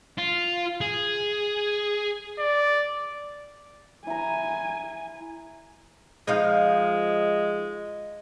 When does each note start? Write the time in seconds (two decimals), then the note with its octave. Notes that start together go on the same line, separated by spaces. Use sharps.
0.18 F4
0.81 G#4
2.39 D5
4.07 E4 G#5 A#5
6.28 F3 G#3 D#4 F5